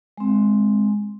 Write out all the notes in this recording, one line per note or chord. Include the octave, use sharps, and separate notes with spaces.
G#3 C4